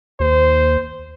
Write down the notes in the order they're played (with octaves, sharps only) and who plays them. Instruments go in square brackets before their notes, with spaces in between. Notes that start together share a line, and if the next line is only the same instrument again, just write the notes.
[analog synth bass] D#2 [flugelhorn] C5